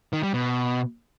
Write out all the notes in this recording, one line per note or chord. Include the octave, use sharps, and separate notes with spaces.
D#3
G3
B2